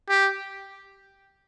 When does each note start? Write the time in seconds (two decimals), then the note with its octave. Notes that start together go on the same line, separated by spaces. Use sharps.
0.10 G4